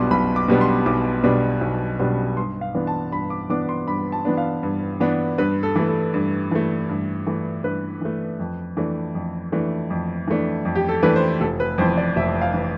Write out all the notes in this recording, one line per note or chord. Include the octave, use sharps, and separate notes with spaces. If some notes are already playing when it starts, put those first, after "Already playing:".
Already playing: B1 B2 G3 B3 D4 C6 D6
B1 B5
D6
B2 G3 B3 D4
C6
B1 D6
B2 G3 B3 D4
B1
B2 G3 B3 D4
G2 C6
F5
E3 B3 D4
A5
G2 B5
D6
E3 B3 D4 D6
C6
G2 B5
A5
E3 B3 D4
F5
G2
E3 B3 D4
G2 B4
A4
E3 A3
A4
G2
E3 A3
G2
E3 A3
G2 B4
E3 A3
F2
E3 A3 D4
F2
E3 A3 D4
F2
E3 A3 D4
F2
G4
A4
E3 A3 D4 B4
C5
F1 A4
B4
F2 E3 C5
D5
F1 E5
F5
E3